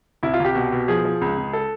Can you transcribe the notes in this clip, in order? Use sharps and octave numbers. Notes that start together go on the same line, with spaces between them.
C2 E4
F4
C2 G4
B2
B2
F3 G#4
F3
C#2
C#2
A4